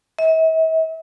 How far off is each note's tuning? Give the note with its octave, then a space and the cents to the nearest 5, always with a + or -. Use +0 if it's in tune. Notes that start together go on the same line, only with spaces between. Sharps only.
E5 -45